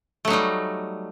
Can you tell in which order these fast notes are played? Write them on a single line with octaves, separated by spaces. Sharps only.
A3 F#3 D#4 G3